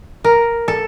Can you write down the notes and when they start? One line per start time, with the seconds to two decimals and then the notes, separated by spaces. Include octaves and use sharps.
0.24 A#4
0.68 A4